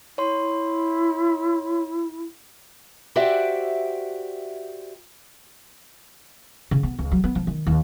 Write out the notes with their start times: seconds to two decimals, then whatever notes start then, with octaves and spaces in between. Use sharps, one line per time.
0.18 E4 C#5 C6
3.16 F#4 G4 C5 D5 E5 F#5
6.71 C#3
6.83 B3
6.99 C#2
7.12 F#3
7.24 B3
7.35 F3
7.47 D#3
7.67 D#2